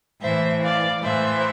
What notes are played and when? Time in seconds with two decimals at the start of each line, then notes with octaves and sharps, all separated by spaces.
0.21 A2 E3 C5 E5
0.63 D5 F5
1.02 A2 E3 C5 E5